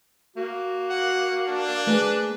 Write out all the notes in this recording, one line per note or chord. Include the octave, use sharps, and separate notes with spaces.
A#3 F#4
F#5
D4
A3 A#3 G#4 B4